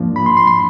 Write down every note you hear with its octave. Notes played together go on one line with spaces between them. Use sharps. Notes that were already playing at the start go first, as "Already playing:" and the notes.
Already playing: G#2 F3 A#3 D4
B5
C6
C6
C6